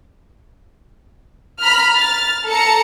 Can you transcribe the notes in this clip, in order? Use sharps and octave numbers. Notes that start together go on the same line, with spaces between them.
A#5 B5 F6 B6
F6 A6
A4 A5 A#5 C#7